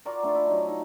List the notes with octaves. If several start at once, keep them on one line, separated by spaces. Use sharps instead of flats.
F4 F#4 A#4 D5
A3 D4 F4
E4
F#3 D#4
D#4